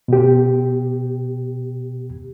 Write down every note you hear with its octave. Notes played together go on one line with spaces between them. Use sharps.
B2 G4